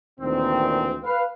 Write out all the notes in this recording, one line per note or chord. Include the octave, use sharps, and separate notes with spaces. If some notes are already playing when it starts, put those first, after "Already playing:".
D2 A#2 D#3 E3 C4
B4 F5